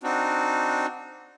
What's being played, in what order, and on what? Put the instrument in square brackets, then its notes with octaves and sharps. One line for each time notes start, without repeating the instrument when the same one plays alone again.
[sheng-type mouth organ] C4 D4 D#4 F#4